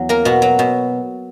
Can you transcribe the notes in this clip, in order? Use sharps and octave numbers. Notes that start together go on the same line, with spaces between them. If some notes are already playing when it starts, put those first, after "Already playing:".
Already playing: E2 F#3
A#3 A#4
B2 F#4
F#3
B2